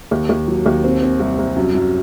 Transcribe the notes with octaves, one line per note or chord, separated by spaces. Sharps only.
D#2
D#2
F#3
D#2
C4
C4
C2
C2
F#2
F#2